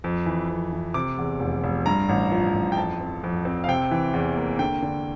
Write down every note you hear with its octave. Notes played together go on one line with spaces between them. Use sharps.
F2
E3
F2
E3
C3 D6
E2
F1
F1
G2 A#5
A1
F3
A1
G5
F2 A5
C4
F2
C4
F5
C3 G5
E3
E2
A#3
D3 G5
D3